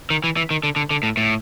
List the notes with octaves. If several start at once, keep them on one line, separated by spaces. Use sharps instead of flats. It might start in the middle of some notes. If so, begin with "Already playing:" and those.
D#3
E3
E3
D#3
D3
D3
D3
A2
A2